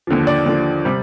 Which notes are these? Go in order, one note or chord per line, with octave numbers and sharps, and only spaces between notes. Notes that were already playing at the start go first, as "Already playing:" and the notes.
D#2 D3 F3
D5
D#2 D3 F3
C3 G3